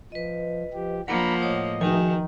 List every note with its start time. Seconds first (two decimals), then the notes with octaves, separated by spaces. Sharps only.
0.12 F3 B4 D#5
0.73 F3 G4
1.08 F3 A#3 D4 F#5 A#5 B5
1.42 A2 C#5 D#5
1.81 D#3 F3 F#4 G#4 G#5